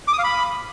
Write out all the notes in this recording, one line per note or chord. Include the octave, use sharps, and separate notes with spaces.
D6
D#6
F5
B5